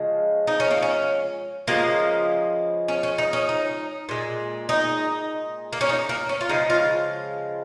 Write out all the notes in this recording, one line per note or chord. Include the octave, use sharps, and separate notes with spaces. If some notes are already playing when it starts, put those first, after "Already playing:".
Already playing: C#3 F3 G#3
D#4
C#4
A#3
C#4
C#3 F3 G#3 A#3
C#4
C#4
D#4
C#4
D#4
A#2 G#3
D#4
A#3
C#4
D#4
A#3
C#4
F4
C#3 F3 G#3 D#4
F4